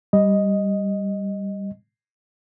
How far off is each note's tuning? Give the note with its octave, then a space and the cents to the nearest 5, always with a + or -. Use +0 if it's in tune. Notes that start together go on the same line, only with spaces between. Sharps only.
G3 +0 D#5 +0